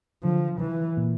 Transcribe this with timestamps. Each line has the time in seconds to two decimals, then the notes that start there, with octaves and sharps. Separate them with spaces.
0.23 D3 F3
0.60 E3
0.97 A#2